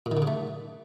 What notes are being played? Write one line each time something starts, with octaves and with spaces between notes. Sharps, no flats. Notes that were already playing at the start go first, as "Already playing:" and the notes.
A#2
D#3
D3
C#3
A3